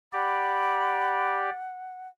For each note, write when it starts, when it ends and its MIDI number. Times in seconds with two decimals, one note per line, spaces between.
0.13 1.50 67
0.13 1.50 74
0.13 2.08 78
0.13 1.36 83